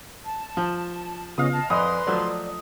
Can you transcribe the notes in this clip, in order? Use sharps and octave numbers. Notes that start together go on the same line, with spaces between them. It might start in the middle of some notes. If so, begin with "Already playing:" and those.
A5
F3
C#3 B3 C#4 F4 D#5 F5 D#6
D#5 A5
F2 B4 D5 D#5 G#5 B5 C6 D#6
F3 F#3 A3 D5